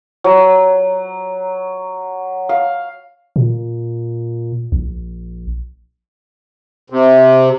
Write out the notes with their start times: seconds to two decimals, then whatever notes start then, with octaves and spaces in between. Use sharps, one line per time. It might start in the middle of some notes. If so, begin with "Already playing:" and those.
0.24 F#3
2.49 F5
3.36 A#2
4.72 A#1
6.90 C3